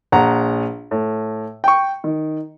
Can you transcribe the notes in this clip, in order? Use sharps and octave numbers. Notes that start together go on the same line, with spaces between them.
A#1 F#5 A#5
A2
G5 C#6
D#3